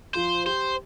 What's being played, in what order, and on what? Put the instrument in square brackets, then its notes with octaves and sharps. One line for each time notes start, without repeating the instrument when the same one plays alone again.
[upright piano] F3 [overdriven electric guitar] C5
[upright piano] G4 [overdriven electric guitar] C5